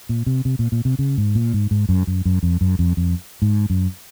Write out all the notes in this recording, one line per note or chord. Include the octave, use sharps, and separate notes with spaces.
A#2
C3
C3
A#2
A#2
C3
C#3
G#2
A#2
G#2
G#2
F#2
F#2
F#2
F2
F#2
F2
F2
G#2
F#2